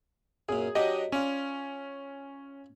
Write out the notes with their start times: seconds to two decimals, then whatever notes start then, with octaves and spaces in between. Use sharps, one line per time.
0.49 F#2 A#2 G#4
0.75 F#3 D4 G4 D#5 F#5
1.12 C#4 F4 D5